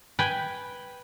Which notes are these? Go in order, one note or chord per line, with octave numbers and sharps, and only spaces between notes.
B4 G5 G#5